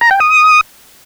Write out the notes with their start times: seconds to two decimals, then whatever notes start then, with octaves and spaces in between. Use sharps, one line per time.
0.01 A#5
0.11 G5
0.20 D#6